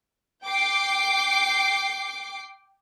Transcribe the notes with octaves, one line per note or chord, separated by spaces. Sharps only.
G5 D6 C7